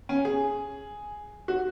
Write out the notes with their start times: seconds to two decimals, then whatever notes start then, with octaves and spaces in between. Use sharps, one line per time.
0.09 C#4
0.25 G#4
1.48 F#4